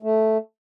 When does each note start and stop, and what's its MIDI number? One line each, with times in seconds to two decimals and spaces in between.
0.03 0.38 57